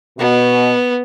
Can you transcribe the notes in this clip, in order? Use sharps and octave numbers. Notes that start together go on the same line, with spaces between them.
B2 B3